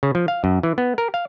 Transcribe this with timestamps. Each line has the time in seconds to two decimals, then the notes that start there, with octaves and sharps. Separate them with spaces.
0.03 C#3
0.15 F3
0.28 F5
0.44 F#2
0.63 E3
0.78 B3
0.98 A#4
1.14 F5